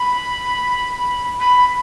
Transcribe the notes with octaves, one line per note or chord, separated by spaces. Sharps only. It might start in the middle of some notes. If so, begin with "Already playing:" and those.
Already playing: B5
B5